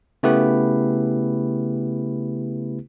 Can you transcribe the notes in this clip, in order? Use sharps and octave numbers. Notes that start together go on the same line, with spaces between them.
C#3 A3 B3 E4 G4 B4